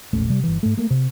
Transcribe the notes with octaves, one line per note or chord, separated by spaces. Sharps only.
E1 A#1 A3 C#4
C3 G3
G1 E3
G#2 A3
A3 A#3
C3 C4